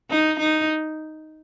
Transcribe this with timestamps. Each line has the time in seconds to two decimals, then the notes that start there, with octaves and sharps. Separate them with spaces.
0.10 D#4
0.39 D#4